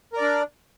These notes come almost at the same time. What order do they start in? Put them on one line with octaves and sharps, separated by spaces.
A#4 D5 D4